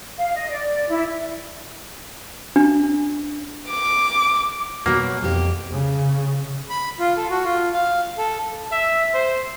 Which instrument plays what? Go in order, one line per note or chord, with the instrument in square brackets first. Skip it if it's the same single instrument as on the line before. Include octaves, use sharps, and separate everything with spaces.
[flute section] F5
D#5
D5
E4
[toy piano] D4
[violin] D6
[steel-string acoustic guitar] B2 F#3 [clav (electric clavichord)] A#3
[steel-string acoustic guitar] F2 G4
[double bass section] C#3
[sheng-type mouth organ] B5
F4
A4
F#4
F4
F5
A4
[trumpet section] E5
C5